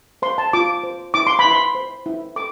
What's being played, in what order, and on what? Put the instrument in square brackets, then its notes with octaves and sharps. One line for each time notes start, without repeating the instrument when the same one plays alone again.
[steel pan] C5 C6
A5
F4 D6
C5
E4 D6
C6
B5
E4
C6
C5
E4
A4 D6